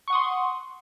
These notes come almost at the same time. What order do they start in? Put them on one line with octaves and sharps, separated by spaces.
C#6 F#5 D#6 C6